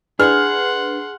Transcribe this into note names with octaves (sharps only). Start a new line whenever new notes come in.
D4 G#4 B4 F#5 C6 F6